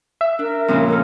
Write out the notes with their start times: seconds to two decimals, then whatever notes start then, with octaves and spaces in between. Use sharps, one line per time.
0.21 E5
0.39 D4 A#4
0.68 F2 A#2 C#3 G3 C#4 G#5
0.88 G#3 A#3 A4 A#4